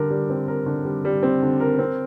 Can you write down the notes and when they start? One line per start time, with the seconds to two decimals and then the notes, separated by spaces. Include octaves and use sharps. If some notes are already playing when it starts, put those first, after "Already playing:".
Already playing: D3 G3 A#4
0.10 G3
0.30 C4
0.48 A#4
0.66 D3
0.85 G3
1.05 G3
1.23 C4
1.42 D3
1.60 A#4
1.79 C4